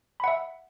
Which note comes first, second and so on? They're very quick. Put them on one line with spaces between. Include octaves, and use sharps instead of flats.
B5 F#5 E5